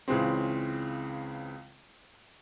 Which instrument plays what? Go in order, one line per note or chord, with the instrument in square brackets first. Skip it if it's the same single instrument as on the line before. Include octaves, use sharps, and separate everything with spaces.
[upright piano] C#2 C#3 E3 G#3 C4